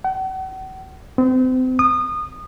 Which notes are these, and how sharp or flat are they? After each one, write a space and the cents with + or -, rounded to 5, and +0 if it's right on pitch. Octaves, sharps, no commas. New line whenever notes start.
F#5 +40
C4 -35
D#6 -25